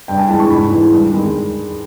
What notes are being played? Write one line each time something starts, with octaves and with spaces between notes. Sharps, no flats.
G2 G5
G#5
E3 G#3 A5
C#6
G#2 B5
E3 G#3
G2
D#3 G#3